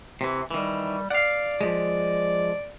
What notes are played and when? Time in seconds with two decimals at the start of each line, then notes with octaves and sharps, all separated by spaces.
0.21 C3 E3
0.51 D#3 E3 G3
1.11 D5 F5 F#5
1.61 F3 G#3